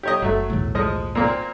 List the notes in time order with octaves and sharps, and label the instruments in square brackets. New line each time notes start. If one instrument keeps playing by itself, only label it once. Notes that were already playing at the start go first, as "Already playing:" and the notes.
[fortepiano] G4 C#5 D#5
[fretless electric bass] F#1 [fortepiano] F#3 A3
[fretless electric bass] B1 E2 A2
[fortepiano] F3 G#3 D#5
A#2 A#3 C4